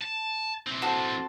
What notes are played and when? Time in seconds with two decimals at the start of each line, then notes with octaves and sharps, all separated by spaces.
0.02 A5
0.67 E3 C4
0.82 F#4 A4 C5